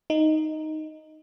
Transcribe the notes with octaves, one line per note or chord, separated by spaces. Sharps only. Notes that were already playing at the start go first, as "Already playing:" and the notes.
D#4